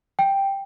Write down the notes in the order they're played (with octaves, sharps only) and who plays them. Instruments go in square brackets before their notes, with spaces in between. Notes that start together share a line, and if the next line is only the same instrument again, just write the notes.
[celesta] G5